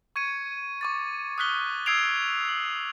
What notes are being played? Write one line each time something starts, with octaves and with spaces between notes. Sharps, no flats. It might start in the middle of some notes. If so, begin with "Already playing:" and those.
C#6 G#6 C#7 D#7
C#6 D6 A6
D#6 F6 F#6 B6 G7
D#6 E6 G#6 C7 D7 F7
F#7